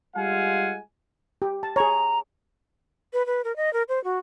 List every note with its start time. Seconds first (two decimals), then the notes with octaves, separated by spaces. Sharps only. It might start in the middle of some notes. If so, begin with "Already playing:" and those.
0.16 G3 G#3 F4 F5 F#5 G#5
1.42 G4
1.63 A5
1.76 G#4 C#5 A#5
3.13 B4
3.26 B4
3.44 A#4
3.56 D#5
3.73 A#4
3.89 C5
4.04 F#4